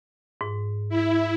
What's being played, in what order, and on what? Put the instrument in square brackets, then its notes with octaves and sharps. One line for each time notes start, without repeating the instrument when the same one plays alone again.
[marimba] G#2
[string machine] E4